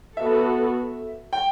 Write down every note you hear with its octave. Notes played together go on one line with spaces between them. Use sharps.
B3 F#4 A4 E5
G5